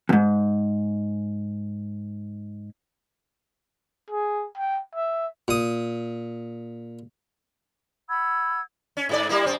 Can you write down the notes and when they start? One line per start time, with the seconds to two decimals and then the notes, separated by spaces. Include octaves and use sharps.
0.09 E2 G#2
4.10 G#4
4.57 G5
4.95 E5
5.48 A#2 D#6
8.09 F#5 B5 E6 G#6
8.97 C#4
9.09 G#2 F4 D5
9.29 G3 A#3 E4
9.45 F#2 C4